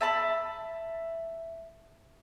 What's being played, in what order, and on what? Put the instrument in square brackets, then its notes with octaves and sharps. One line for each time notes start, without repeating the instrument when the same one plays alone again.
[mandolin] E5 A5 B5